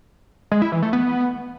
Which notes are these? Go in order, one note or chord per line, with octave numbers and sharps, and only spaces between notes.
G#3
E4
E3
A3
B3